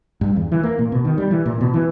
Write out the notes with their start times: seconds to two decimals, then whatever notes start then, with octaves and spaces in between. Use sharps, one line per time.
0.21 G2
0.36 E2
0.52 E3
0.63 A#3
0.79 A#2
0.92 B2
1.05 D#3
1.18 G3
1.31 E3
1.46 A#2
1.61 B2
1.74 E3